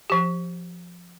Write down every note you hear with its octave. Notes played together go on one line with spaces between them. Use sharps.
F3 G4